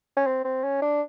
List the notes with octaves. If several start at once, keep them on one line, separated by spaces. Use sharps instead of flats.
C#4
C4
C4
C#4
D4